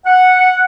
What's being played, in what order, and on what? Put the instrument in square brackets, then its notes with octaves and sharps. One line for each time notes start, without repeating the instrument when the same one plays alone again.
[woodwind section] F#5